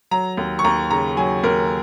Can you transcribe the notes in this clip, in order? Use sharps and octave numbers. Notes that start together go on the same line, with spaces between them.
F#3 A#5
D#2
C#6
D#2 A#5
C#3 A#5
F#3 G#5
D#2 A#4